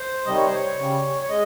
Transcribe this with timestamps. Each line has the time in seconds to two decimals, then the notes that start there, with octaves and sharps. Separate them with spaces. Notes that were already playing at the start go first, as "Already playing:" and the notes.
Already playing: C5
0.26 C3 D#3 G3 D#5
0.36 C#5
0.46 C5
0.55 C#5
0.78 C#3 G3
1.22 C#5
1.29 G#3 D#5